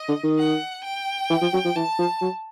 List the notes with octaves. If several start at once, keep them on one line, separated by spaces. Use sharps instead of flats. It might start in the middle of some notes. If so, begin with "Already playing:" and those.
Already playing: D#5
D3
D#3
F#5
G5
E3
F3
F#3
F3
E3 A5
F3
F#3